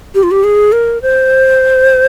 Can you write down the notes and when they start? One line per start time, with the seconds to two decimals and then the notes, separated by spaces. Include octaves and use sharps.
0.15 G4
0.23 F4
0.31 G4
0.44 G#4
0.72 A#4
1.02 C5